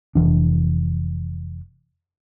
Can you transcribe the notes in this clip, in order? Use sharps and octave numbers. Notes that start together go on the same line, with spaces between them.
F1 E2 E3 D4